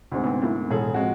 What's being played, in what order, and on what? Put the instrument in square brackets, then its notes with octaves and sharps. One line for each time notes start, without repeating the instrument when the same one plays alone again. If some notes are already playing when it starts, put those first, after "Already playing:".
[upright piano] D2 G#2 [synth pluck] C3 C4
[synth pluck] B3 C4
A3 A#3 E4
[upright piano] E1 G#4 A4 [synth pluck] A2
[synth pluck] F3 C4 [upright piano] G#3 F#4